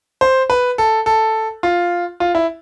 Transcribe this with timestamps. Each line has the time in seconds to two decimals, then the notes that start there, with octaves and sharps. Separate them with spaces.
0.21 C5
0.50 B4
0.78 A4
1.06 A4
1.63 F4
2.20 F4
2.35 E4